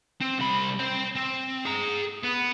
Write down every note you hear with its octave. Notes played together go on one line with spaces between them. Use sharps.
C4
C2 B5
C5 G5
C4
G#4 A#5
B3